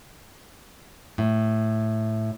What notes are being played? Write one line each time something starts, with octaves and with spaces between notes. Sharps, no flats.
A2